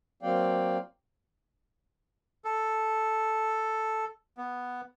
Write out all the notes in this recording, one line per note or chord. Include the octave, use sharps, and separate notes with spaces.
F#3 A#3 C4 D5 F5 G5
A4
B3